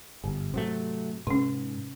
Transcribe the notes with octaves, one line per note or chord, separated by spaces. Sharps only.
G1 G#2
C3 F#3 A3
G#2 C3 C#4